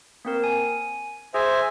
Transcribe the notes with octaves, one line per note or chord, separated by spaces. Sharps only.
A#3 C4 A#4
G#5
G#4 C5 E5 G#5